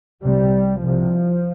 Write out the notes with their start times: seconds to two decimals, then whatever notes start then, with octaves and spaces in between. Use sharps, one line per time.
0.23 C2 C3 G3
0.83 C2 C3 F3